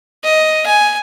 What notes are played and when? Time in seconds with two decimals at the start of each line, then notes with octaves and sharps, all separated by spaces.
0.24 D#5
0.66 G#5